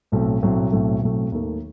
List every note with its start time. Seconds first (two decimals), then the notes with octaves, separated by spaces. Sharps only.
0.12 B1 A2 F#3 A3 C4
0.42 B1 A2 F#3 A3 C4
0.72 B1 A2 F#3 A3 C4
1.01 B1 A2 F#3 A3 C4
1.32 D#2 D#3 A3